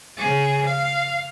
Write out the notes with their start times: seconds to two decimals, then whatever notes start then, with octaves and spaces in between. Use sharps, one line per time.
0.17 C#3 G#4
0.65 F5